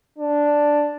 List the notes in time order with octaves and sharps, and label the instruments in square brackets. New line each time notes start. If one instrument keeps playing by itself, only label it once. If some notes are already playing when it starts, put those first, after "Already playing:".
[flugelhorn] D4